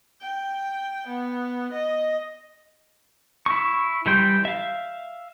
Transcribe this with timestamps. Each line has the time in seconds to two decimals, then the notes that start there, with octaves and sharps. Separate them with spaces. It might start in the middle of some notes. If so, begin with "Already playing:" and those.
0.22 G5
1.07 B3
1.72 D#5
3.46 E4 C#6
4.06 E3 G3 G5 C6
4.45 E5 F5